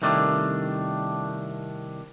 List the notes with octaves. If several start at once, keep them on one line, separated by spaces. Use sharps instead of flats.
C2 D#3 A3 D4